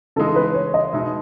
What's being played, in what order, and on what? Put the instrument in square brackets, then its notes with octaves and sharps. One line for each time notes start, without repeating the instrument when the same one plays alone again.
[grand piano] C#3 E3 G#3 D#4 [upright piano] A4
[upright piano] B4
C#5
D#5
[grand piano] B2 G#3 D#4 [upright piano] E5